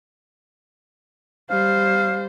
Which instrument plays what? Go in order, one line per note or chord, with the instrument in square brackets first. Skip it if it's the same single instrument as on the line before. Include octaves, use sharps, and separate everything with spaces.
[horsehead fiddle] G3 C5 [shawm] F5